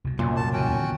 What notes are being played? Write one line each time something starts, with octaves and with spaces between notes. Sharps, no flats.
C2 B2
F#2 A#2
A5
C#3 E3 C#4 F#4 G5
D#2 D3 B3